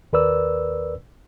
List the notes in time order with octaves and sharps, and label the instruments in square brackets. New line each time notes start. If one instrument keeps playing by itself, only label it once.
[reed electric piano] D#2 A#4 B4 D5 E6